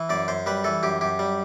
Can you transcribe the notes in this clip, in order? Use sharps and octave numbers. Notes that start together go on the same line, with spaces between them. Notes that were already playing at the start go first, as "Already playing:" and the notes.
Already playing: E3
F#2 D5
F#2 C5
G3 B4
E3 A4
F#2 G4
F#2 G4
G3